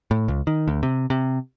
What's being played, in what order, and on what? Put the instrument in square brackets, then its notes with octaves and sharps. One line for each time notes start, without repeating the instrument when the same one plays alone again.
[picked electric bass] A2
C#2
D#3
D2
C3
C3